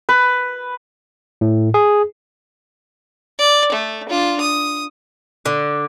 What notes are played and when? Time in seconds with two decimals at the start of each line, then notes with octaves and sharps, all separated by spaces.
0.09 B4
1.41 A2
1.74 G#4
3.39 D5
3.72 A3
4.09 D4 F4
4.40 D#6
5.46 D3